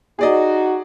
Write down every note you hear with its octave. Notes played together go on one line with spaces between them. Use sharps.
D#4 F#4 G#4 D5 D#5